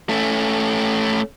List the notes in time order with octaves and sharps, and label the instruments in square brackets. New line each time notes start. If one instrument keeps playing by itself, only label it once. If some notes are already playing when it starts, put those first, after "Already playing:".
[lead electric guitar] A3 C#4